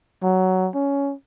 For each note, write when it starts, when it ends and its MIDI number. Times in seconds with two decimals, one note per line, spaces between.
0.23 0.70 54
0.75 1.14 61